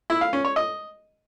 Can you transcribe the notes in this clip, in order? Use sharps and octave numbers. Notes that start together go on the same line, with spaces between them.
E4
F5
C#4
C#5
D#5